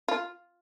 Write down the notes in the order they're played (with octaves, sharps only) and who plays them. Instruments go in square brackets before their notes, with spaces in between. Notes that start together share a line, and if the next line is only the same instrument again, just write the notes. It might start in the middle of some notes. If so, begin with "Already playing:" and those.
[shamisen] F4